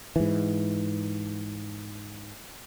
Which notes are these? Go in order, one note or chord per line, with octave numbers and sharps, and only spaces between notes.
G#2 E3